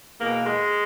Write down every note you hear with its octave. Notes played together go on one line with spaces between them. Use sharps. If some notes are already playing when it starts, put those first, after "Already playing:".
E2 B2 A#3
G#3